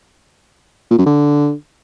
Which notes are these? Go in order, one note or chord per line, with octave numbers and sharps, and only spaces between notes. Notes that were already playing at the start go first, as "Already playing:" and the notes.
A#2
F#2
D3